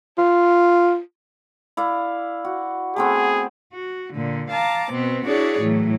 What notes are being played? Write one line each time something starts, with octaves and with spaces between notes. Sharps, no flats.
F4
E4 D5 F5
F#4
A3 B3 C4 G#4
F#4
A#2 D3
F5 A5 A#5 D6
B2 B3 C4
D4 E4 F#4 G#4 C#5 D5
A2 E3 F#3